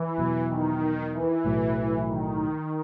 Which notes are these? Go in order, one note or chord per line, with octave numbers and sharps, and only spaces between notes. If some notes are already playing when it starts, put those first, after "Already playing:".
Already playing: E3
E2 B2 F#3 B3
D#3
E3
B1 A2 F#3
D#3